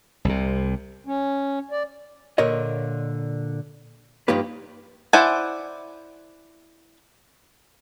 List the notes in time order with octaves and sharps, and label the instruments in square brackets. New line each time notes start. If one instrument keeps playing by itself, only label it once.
[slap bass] C2 C3
[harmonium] C#4
D5
[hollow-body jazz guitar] A#2 D3 A#4 C#5 D#5
G2 F3 A#3 D#4 G4 B4
[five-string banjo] E4 C5 D5 F#5 G#5